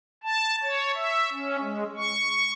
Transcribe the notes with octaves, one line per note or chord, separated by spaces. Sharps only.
A5
C#5
E5
C#4
G#3
C#6